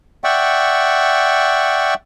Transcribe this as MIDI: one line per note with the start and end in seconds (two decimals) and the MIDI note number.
0.24 1.94 74
0.24 1.94 76
0.24 1.94 78
0.24 1.94 79
0.24 1.94 85